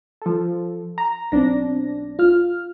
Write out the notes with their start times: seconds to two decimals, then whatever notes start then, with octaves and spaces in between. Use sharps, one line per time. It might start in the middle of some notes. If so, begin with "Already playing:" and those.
0.22 F3 A4
0.98 A#5
1.32 B1 C4 D4 A#6
2.19 F4 F6